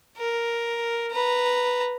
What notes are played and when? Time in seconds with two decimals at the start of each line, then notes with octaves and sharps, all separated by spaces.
0.18 A#4
1.11 B4 A#5